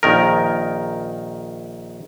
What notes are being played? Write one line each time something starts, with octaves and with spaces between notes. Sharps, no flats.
A#1 D#3 A#4